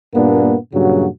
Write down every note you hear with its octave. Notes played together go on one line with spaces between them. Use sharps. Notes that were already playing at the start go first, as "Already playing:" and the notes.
G2 A#2 A#3 B3 D4
G2 A#2 C#3 F#3 F#4